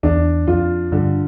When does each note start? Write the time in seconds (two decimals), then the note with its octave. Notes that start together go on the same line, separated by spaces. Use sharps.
0.03 E2 D4
0.47 F2 F4
0.92 G2 D3